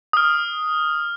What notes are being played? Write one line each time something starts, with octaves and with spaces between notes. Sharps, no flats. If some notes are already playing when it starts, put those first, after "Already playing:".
D#6 F6